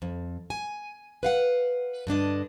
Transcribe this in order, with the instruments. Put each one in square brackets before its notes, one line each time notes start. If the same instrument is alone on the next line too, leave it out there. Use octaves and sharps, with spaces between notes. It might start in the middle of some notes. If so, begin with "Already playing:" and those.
[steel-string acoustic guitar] F2
G#5
B4 F5 F#5
G2 D3 D4 D#5